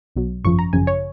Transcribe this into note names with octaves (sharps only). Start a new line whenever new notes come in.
B1 B2 F#3
G#1 F#2 C#3 F3 C#6
A#5
G#1 F#2 C#3 F3 G#5
C#5